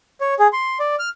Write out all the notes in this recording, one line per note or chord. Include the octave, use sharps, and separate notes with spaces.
C#5
G#4
C6
D5
F6